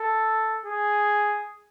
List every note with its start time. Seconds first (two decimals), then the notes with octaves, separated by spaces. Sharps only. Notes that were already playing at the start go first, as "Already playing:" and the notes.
Already playing: A4
0.66 G#4